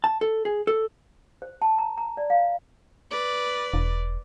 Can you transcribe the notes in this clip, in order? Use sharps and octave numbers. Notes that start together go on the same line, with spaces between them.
A5
A4
G#4
A4
C5
A5
A#5
A#5
D5
F5
B4 D5
E1